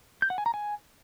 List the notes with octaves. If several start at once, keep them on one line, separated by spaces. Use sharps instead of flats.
G6
F#5
G#5
A#5
G#5